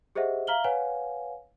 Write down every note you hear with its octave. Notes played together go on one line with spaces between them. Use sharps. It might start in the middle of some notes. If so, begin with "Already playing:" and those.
G4 G#4 C5 D#5 E5 F#5
E5 F5 A#5 F6 F#7 G7
B4 C#5 F5 F#5 G#5